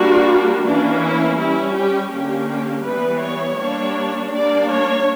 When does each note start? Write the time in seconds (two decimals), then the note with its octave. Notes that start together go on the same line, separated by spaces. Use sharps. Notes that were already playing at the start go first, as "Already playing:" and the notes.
Already playing: G3 A#3 D4 F#4
0.65 E3 A#3 C#4 D4
1.02 E4
1.39 G3 C#4 E4
1.76 G4
2.12 D3 A#3 C#4 G4
2.49 G4
2.86 E3 G3 B3 B4
3.22 C#5
3.60 G3 A#3 D4
4.33 G3 A#3 D4 D5
4.69 C#5